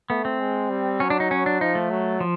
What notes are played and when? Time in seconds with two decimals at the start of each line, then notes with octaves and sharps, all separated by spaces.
0.10 A3 B3
0.25 C4
0.40 G#3
0.70 G3
1.00 F#3 C#4
1.10 D4
1.20 D#4
1.31 C#4
1.46 D4
1.61 F3 D#4
1.75 A3
1.91 F#3
2.20 F3